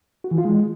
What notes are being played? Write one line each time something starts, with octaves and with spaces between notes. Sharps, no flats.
F#4
E3
F4
G#3